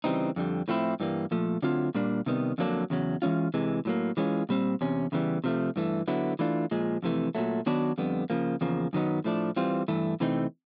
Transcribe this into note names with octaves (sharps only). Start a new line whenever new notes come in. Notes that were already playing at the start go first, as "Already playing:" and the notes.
C#3 E3 G3 C4 D#4
F2 D3 G3
A2 F3 A3 C4 E4
G2 E3 G3 A#3
A#2 F3 A3
D3 F#3 A3 C4 F4
A#2 G3 A#3 D4
C3 D#3 G3 B3
F2 D3 F#3 A#3 D4
E2 C#3 F#3
E3 G#3 C#4 F4
C3 E3 G#3
A2 F#3 A#3
E3 G#3 C#4 F4
A#2 G3 C4
E2 C3 C#4
E2 C#3 E3 G3
C3 F3 A3
G2 E3 A3
D3 F#3 B3 E4
E3 A3 D4 F4
A#2 F3 G#3
F2 C3 E3 A3
A#2 F#3 A3
D#3 F#3 B3 D4 F#4
F2 D3 G3 B3
C#3 F3 A#3
E2 C#3 F3 A#3
F#2 D#3 F#3 B3 D#4
A2 F3 A3 D4
E3 G3 C4 F4
G2 E3 A3
C3 E3 A3 C4 D#4